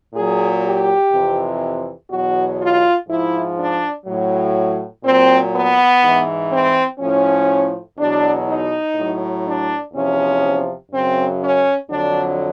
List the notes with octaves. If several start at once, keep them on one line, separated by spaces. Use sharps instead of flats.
A#2 F#3 G#4
G4
F2 C3 E3
E2 B2 F#3 F#4
F4
G#2 F3 E4
D4
A2 F#3
A#2 F#3 C4
B3
G#2 E3
C4
A2 F3 C#4
E2 B2 F#3 D4
D#4
A2 F#3
D4
E2 C3 F3 C#4
F#2 C#3 F#3 C4
C#4
F2 D3 F#3 D4